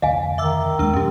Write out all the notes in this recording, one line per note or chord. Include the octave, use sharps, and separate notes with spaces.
F1 D2 D#5 F5 G#5
D#3 E5 D6 E6
D#2 G#3 D4 E6
E1 F#2 C#4 G4